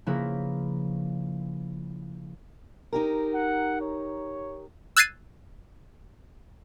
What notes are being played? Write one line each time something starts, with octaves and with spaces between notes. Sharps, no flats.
C#3 F3 A#3 E4 A#4 B4
D#4 G4 A#4
F#5
C#5
E6 F#6 G#6 A6 C7 D#7